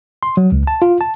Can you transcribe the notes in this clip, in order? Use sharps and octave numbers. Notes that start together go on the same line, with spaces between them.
C6
F#3
C#2
A5
F4
A5